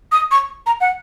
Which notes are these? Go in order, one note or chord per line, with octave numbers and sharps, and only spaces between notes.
D#6
C#6
A#5
F#5